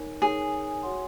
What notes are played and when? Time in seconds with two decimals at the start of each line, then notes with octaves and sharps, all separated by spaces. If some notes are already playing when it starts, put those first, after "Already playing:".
Already playing: D#4 A#4 C#5 G#5
0.22 D#4 G#4 A#4 C#5 G#5
0.83 F#4 C#5 F#5 C6